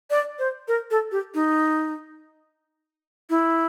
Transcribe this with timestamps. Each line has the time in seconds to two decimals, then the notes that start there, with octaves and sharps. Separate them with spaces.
0.10 D5
0.39 C5
0.68 A#4
0.91 A4
1.12 G4
1.34 D#4
3.30 E4